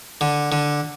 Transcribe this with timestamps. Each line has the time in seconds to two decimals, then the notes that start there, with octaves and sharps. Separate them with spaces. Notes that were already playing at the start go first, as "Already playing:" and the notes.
0.21 D3
0.52 D3